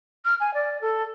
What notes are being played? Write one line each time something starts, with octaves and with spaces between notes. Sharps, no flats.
F6
G#5
D5
A4